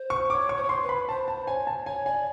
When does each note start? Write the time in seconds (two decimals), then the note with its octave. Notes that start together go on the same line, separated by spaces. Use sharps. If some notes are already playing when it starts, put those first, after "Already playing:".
Already playing: C5
0.10 C#6
0.30 C#5 D6
0.49 C#6
0.57 C5
0.63 C#5
0.69 C5 C6
0.83 B4
0.89 B5
1.09 C5 A5
1.28 A5
1.47 C#5 G#5
1.67 A5
1.86 C#5 G#5
2.06 D5 G#5